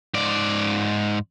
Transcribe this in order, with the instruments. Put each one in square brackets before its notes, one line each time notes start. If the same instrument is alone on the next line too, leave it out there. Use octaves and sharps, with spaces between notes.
[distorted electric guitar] G#2 D5